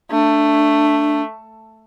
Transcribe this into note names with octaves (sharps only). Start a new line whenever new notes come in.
A3 D4